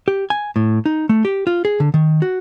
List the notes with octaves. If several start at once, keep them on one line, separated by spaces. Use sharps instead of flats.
G4
G#5
A2
D#4
A3
G4
F4
G#4
D3
D#3
F#4